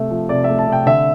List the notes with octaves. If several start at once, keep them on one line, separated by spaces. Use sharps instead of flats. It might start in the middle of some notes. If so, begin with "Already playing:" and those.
Already playing: C3 A3 E5
F3
C3 D5
A3 E5
A5
C3
G5
D3 E5